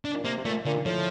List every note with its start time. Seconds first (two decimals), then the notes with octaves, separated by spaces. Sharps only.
0.05 D4
0.13 A#2
0.24 C3 A#3
0.37 C3
0.45 A#2 A3
0.65 A#2 D3
0.86 A2 F3